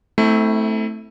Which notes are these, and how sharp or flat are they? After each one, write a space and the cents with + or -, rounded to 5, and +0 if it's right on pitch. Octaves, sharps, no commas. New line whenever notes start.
A3 +0 C4 -15 E4 -30